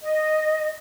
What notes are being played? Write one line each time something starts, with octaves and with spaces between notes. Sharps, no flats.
D#5